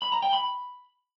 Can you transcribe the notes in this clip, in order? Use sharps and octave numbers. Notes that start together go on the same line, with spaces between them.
B5
A#5
G5
B5